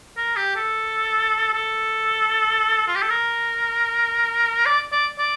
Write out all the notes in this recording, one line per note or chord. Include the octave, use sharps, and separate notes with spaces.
A#4
G4
A4
A4
F4
G4
A4
A#4
D5
D5
D5